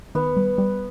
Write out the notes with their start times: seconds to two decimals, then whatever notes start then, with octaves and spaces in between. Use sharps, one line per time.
0.15 D#3 B3
0.37 G3
0.58 G3